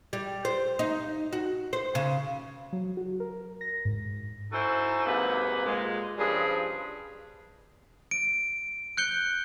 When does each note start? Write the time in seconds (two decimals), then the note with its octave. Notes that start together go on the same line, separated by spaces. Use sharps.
0.13 G3
0.45 C5
0.79 D#4
1.33 F#4
1.73 C5
1.95 C#3
2.73 F#3
2.97 F#4
3.20 A#4
3.61 A#6
3.85 G#2
4.52 C#4 D#4 E4 F#4 A4 C5
5.06 G#2 C3 F#3 A#3 B4
5.66 A#2 G#3
6.18 G2 C#3 F3 G3 G#4
8.11 D7
8.97 F#6 G6 C#7 G7